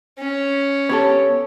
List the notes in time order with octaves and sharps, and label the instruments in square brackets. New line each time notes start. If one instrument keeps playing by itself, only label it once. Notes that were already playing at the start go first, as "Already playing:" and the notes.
[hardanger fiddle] C#4
[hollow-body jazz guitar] B3 G4 A4 [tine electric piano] C#5